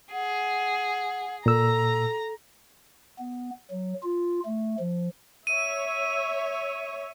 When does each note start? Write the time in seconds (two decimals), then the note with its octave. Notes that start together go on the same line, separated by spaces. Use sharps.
0.12 G#4 F#5
1.46 A#2 A4 A#5 E6
3.19 B3
3.71 F#3
4.03 F4
4.45 A3
4.79 F3
5.47 C#5 E5 D#7